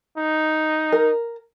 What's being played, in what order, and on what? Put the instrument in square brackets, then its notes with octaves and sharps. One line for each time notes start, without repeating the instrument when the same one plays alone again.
[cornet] D#4
[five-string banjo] A#4